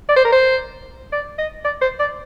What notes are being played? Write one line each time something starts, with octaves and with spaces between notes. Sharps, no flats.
D5
C5
A#4
C5
D5
D#5
D5
C5
D5